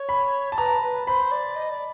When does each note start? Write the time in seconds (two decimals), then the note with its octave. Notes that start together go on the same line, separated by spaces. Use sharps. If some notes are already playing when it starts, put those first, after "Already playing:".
Already playing: C#5
0.09 B5
0.52 A5
0.58 B4 A#5
0.82 B4
1.07 C5 B5
1.32 D5
1.56 D#5
1.70 D5